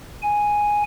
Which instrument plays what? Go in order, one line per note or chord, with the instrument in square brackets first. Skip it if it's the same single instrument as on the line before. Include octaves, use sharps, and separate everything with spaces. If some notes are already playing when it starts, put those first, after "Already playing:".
[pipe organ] G#5